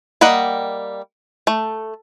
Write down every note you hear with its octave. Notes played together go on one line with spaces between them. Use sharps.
G3 A#3 D#5 F#5
A3